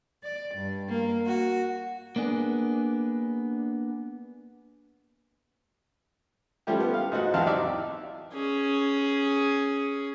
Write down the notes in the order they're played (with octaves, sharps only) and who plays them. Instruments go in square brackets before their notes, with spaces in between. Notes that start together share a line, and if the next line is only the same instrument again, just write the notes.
[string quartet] D5
G2
A#3
F#4
[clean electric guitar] A#3 B3 D4 G#4
[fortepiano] F3 G3 A3 C#4 G4
B3
F5
G#2 D#4 F#4
E2 F#3 C4 F5 A5
D#4 D5 E5
[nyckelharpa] C#4 G#4